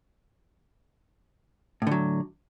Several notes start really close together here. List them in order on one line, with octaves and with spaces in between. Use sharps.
A2 D3 F#3